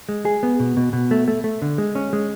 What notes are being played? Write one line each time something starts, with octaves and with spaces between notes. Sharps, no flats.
G#3
G#4
B3
B2
B2
B2
A3
A3
A3
D3
G#3
C#4
G#3